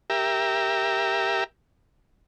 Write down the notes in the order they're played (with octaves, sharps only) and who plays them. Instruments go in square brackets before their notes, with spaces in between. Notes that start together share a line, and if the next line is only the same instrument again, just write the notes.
[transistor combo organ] G4 A#4 E5